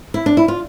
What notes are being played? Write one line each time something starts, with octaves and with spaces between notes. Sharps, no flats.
E4
D4
E4
F4